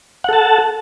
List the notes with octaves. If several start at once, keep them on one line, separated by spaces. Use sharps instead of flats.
A4 F#5 A5